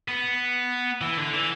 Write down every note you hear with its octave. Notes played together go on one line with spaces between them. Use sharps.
B3
E3
D3
E3